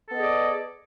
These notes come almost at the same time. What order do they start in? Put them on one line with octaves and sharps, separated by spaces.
A4 B3 D#5 G#4 D5